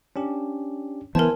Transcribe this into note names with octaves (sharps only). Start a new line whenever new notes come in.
C#4 D4 G4
E3 B3 A#4 C5 G#5 A5